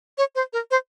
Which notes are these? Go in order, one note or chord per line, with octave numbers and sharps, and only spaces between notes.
C#5
C5
A#4
C5